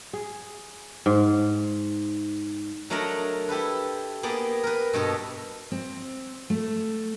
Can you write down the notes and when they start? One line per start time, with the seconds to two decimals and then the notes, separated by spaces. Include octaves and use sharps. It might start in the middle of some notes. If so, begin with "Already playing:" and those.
0.13 G#4
1.06 G#2
2.90 F#3 A3 D4 A#4 D#5 A#5
3.49 E4 G4 A4 B4
4.23 A#3 B3 G4 G#4 D5
4.63 A#4 B4
4.93 G2 B2 A4 D#5
5.72 C4
6.50 A3